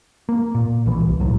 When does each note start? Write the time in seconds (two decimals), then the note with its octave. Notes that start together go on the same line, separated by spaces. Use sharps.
0.29 A#3
0.55 A#2
0.86 A#1 E3
1.00 C2
1.20 C2 A2 F#3